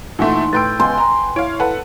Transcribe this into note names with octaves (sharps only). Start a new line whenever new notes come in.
A#2 E3 A3 D#4 F#5 C6
A2 B4 G5 C6 E6 G6 A6 D7
C#2 B3 G#5 C6
A#5
E4 C#5 F5 D7
A4 B4 F#5